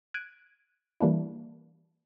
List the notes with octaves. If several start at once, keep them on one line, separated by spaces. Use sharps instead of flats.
F#6 G#6 D7 D#7
E3 G3 A#3 D4 E4